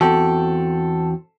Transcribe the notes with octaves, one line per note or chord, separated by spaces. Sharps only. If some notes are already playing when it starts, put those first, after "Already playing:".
E2 C4 F#4 A4 G5